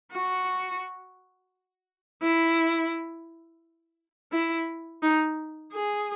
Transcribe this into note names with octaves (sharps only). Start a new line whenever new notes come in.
F#4
E4
E4
D#4
G#4